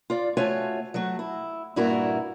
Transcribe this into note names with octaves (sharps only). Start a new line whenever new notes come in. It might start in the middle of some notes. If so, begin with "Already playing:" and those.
F4 D5
A3 F4 F#4 C#5 G#5
F#3 A3 F#4
E4
G2 A#2 E4 F#4 A#4